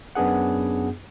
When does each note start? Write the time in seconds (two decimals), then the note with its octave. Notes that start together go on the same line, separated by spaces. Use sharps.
0.15 F#2 B3 D4 G#4 F#5